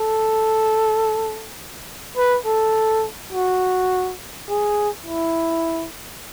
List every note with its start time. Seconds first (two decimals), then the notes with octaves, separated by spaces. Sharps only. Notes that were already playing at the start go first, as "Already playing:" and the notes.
Already playing: A4
2.17 B4
2.46 A4
3.33 F#4
4.49 G#4
5.06 E4